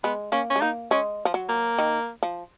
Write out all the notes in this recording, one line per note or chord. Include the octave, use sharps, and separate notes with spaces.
G#3 B3
A#3 C#4
C#4
G#3
A#3 D#4
G#3 C#4
F3
F#3
A#3
D#3
F3